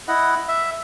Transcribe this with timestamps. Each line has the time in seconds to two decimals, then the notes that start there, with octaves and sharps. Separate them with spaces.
0.08 E4 D#5 F#5
0.48 E5